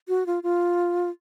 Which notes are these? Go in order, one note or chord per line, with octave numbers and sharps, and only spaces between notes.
F#4
F4
F4